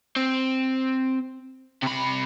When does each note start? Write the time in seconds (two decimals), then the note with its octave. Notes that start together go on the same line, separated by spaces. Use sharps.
0.16 C4
1.82 C3 B5